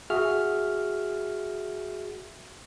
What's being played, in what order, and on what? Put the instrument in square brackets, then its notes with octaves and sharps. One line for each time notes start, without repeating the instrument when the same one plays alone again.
[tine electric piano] F#4 G#4 E5 F6